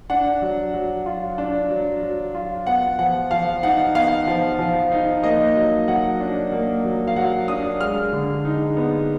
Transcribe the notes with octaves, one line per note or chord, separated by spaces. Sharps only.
D4 F#5
F#3
F#3
F4
D4
F#3
F#3
F4
B3 F#5
F3 F#5
F3 F5
D#4 F#5
B3 F5
F3
F3
D#4
A#3 D#5
F#3
F#3 F#5
D4
A#3
F#3
F5
F#3 F#5
D4 D#6
G#3 F6
D3
D#4
B3